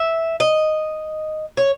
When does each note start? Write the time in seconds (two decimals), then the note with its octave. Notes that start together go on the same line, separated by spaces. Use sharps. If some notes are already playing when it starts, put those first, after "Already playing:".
Already playing: E5
0.40 D#5
1.57 C#5